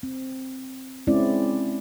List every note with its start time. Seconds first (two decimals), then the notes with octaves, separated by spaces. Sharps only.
0.03 C4
1.07 G#3 C4 C#4 E4 D5